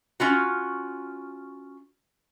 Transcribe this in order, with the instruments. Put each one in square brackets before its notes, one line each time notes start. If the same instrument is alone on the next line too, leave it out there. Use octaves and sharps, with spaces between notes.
[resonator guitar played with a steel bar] C#4 F4 F#4